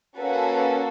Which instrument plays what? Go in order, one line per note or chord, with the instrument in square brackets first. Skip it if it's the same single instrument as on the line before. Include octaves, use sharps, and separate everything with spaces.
[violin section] A#3 C#4 F#4 A4 B4